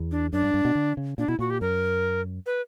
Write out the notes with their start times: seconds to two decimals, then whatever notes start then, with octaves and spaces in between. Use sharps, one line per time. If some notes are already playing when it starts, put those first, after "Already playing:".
Already playing: E2
0.11 D4
0.33 F#2 D4
0.43 G2
0.54 G2
0.65 B2
0.75 D3
0.97 C#3
1.18 A#2 D4
1.28 B2 E4
1.39 A#2 F#4
1.50 G4
1.61 F#2 A#4
2.46 B4